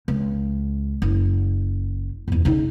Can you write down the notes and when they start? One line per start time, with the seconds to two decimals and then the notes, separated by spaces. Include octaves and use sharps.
0.08 C#2
1.02 F#1
2.28 E2 G2
2.45 C#3 D#4